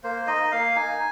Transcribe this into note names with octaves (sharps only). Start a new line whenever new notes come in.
A#3 C5
D#4 D#5
A#3 F5
D#4 G#5